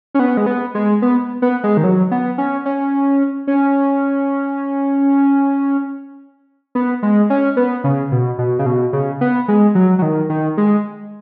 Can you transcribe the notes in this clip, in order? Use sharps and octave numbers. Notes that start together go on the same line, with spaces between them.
C#4
B3
G#3
B3
G#3
B3
B3
G#3
D#3
F#3
B3
C#4
C#4
C#4
B3
G#3
C#4
B3
C#3
B2
B2
C#3
B2
C#3
B3
G#3
F#3
F#3
D#3
D#3
G#3